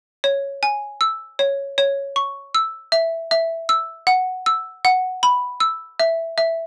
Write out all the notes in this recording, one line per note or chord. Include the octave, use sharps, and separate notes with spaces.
C#5
G#5
E6
C#5
C#5
C#6
E6
E5
E5
E6
F#5
E6
F#5
B5
E6
E5
E5